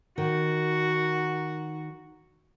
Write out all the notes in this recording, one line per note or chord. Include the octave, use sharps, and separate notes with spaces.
D#3 F#4